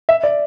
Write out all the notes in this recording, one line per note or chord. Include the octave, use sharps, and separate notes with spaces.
E5
D5